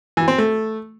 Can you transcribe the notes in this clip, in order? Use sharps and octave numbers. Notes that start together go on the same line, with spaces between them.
E3
C4
A3